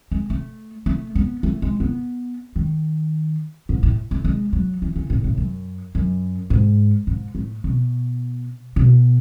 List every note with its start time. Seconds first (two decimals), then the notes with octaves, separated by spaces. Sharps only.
0.11 G#3
0.30 A3
0.86 A3
1.15 B3
1.43 A3
1.62 G#3
1.80 B3
2.56 D#3
3.69 G#2
3.83 A2
4.11 A3
4.25 G#3
4.53 F#3
4.82 E3
4.96 C#3
5.10 A2
5.24 A2
5.38 F#2
5.95 F#2
6.50 G#2
7.07 G#2
7.35 A2
7.64 B2
8.76 B2